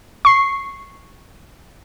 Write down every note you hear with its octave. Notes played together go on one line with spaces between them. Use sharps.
C#6 C7